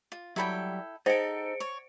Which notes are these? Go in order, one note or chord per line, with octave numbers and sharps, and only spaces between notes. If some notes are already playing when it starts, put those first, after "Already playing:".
F4
F#3 G3 E4 A4 G5 B5
D#4 G#4 A4 C5 C#7 D7
C#5